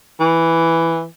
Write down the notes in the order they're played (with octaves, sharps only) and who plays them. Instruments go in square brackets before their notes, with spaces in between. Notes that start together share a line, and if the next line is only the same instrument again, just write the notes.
[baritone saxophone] E3